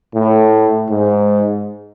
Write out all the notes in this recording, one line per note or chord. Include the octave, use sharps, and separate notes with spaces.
A2
G#2